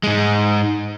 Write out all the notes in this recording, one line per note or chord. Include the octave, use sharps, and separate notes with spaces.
G#2 G#3